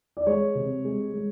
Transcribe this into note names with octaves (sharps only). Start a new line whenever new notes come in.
D5
G#3 C#5
C3
G#3
G#3